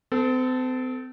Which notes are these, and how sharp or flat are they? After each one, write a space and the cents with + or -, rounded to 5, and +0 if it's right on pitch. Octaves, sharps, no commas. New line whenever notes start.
C4 -40 A4 +0